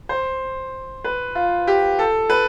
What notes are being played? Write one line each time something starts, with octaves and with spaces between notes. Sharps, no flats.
C5
B4
F4
G4
A4
B4